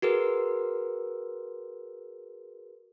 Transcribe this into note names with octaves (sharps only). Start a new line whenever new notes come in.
F#4 G#4 A#4 B4